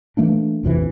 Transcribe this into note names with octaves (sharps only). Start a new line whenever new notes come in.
E3 A3 A#3 D4
A#1 F2 C3 E3